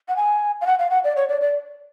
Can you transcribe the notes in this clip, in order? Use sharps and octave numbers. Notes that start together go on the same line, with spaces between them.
F#5
G#5
F5
F#5
F5
F#5
D5
C#5
D5
D5